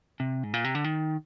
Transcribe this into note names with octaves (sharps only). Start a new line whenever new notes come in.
C3
G#2
A#2
C3
D3
D#3